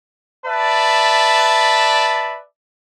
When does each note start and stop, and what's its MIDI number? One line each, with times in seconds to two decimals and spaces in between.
0.46 2.39 71
0.46 2.39 74
0.46 2.39 76
0.46 2.39 81